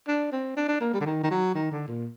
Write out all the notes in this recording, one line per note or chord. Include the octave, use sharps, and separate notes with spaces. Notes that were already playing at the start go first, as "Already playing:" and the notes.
D4
C4
D4
D4
A#3
G3
D3
D#3
D#3
F#3
D#3
D3
A#2